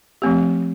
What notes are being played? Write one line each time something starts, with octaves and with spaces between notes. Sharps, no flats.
F3 A3 C4 G4